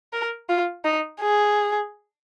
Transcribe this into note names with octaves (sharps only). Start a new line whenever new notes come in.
A#4
F4
D#4
G#4